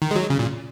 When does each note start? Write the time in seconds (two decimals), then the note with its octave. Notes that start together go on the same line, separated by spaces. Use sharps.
0.02 D#3
0.11 G#3
0.16 F#3
0.30 C#3
0.39 A#2